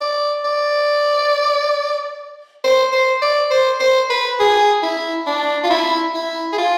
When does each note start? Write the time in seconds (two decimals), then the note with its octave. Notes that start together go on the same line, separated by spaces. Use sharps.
0.01 D5
0.45 D5
2.64 C5
2.92 C5
3.22 D5
3.51 C5
3.80 C5
4.10 B4
4.40 G#4
4.82 E4
5.27 D4
5.64 F4
5.70 E4
6.14 E4
6.52 G#4
6.58 F4